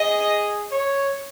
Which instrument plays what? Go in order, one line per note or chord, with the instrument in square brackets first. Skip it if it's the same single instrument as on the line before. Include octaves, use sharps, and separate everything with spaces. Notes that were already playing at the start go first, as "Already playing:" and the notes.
Already playing: [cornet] G#4 [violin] D#5
[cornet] C#5